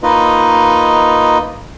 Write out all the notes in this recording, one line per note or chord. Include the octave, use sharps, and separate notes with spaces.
A#3 D#4 F4 B4 D#5